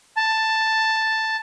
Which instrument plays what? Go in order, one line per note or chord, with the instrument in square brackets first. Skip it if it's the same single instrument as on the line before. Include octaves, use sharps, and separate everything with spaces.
[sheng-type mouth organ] A5